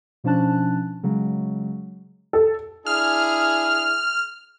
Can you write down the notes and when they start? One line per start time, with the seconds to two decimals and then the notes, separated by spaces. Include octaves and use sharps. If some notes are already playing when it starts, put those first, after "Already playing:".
0.24 B2 F3 C#4 D4 A5 F#6
1.03 C#3 F#3 G#3
2.33 A4
2.86 D4 E4 G#4 F6